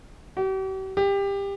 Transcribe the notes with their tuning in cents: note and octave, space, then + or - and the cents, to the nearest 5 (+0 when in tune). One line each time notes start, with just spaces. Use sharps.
G4 -45
G4 +20